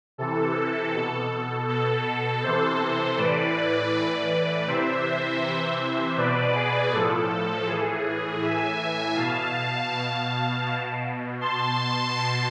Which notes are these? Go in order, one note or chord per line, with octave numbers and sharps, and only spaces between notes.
C3 E3 A4
B2
B2 A4
C3 E3 A4 C5
A4 C5
A2 E3 B4 D5
A2 E3
C3 E3 C5 E5
C3 E3
B2 B4 D5
G#4 B4
A2 F3 A4
A2 E3 G#4
A2 E3 E5 G#5
B2 F5 A5
B2
B2
B2 A5 C6
B2